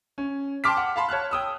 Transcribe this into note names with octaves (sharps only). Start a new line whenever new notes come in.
C#4
G5 A5 C6 D6 F6 B6
F#5
F5 A5 B5 C6
C#5 A5 F6 F#6
G5 D#6 E6